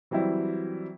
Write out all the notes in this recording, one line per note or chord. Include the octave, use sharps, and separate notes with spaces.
E3 F#3 G3 C4 E4